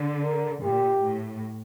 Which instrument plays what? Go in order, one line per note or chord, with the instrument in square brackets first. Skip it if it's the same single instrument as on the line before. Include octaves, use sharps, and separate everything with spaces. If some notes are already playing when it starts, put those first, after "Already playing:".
Already playing: [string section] D3
[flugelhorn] A#4
[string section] A#2 [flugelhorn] G4
[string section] A2